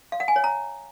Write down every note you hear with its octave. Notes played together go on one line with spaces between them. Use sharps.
F5
F#5
G#5
C#5
A#5